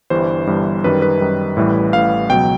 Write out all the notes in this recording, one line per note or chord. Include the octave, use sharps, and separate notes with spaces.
G1 G2 E3 G3 C5
G1 G2 E3 G3
F#2 D#3 G3 B4
B4
F#2 D#3 G3
A1 A2 E3 G3
A1 A2 E3 G3 F5
C#2 B2 F#3 G5